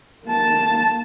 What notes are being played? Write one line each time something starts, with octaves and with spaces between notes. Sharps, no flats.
A#3 A5